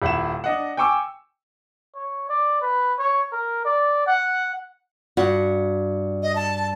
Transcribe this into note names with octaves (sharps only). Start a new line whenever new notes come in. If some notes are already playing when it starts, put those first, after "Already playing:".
D#1 E4 F#5 B5 E7
D4 D#5 F#5
G5 G#5 C#6 D6 E6
C#5
D5
B4
C#5
A#4
D5
F#5
G2 F#4
D#5
A5